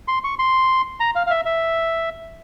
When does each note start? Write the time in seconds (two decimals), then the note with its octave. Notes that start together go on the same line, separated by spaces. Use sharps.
0.08 C6
0.24 C#6
0.39 C6
1.00 A#5
1.15 F5
1.27 F5
1.30 E5
1.45 E5